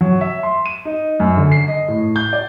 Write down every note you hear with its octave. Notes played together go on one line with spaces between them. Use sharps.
F#3
E5
C6
D#7
D#4
F#2
D3
C7
D#5
A2
G6
D5